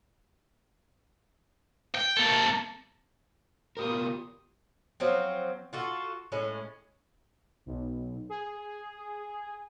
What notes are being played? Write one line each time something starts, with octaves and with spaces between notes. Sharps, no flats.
G5
A#3 A4
B3 F4 G4 A#4 D#6
F3 F#3 C4
F4 F#4 A4
A2 G#3 C#4
B1
G#4